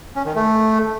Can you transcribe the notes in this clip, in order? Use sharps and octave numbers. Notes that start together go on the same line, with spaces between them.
C#4
D#3
A3